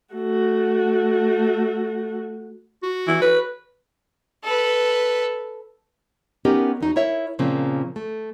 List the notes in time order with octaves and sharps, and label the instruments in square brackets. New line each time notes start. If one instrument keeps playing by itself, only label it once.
[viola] A3 F#4
[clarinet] F#4
[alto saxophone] E3
B4
[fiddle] A4 B4
[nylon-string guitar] B3 C#4 D#4 G4 A#4
E2 D#4 F#4
E4 A#4 C#5 E5
A#2 C#3 F3 A#3 C4
A3